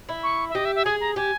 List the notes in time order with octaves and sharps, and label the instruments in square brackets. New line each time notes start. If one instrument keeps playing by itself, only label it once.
[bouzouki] E4
[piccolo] C#6
E5
[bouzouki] G4 [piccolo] D#5
[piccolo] E5
E5
[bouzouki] G#4 [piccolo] G#5
[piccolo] A#5
[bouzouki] G4 [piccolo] G#5